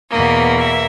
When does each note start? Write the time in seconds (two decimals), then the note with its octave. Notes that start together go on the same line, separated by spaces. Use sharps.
0.10 E2 B2 A#3 D#5
0.57 E5